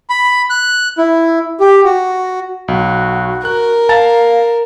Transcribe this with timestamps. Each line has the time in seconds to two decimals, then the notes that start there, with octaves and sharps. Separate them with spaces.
0.10 B5
0.50 F#6
0.98 E4
1.60 G4
1.85 F#4
2.68 B1 F#4
3.45 A#4 F#6
3.89 F5 A5 A#5 A6